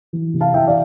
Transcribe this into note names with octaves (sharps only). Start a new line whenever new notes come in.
E3
C3
F5 A5
E3 E5 G5
D5 F5